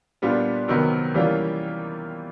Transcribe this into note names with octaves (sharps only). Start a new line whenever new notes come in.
A#2 G3 B3 D4 F4
C3 D#3 F#3 B3
E3 G3 A#3 C#4 F4